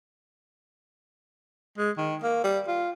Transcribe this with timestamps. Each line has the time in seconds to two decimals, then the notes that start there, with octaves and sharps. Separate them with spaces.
1.78 G#3
1.98 D#3
2.23 A#3
2.44 G3
2.68 F4